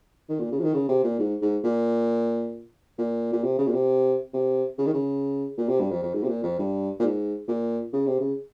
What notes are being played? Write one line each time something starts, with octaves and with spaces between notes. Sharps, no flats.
D#3
A#2
C#3
F3
D#3
C#3
C3
A#2
G#2
G#2
A#2
A#2
A#2
C3
C#3
A#2
C3
C3
C#3
D#3
C#3
A#2
C3
G2
F2
F2
G#2
C3
A#2
F2
G2
A#2
G#2
A#2
C#3
C3
C#3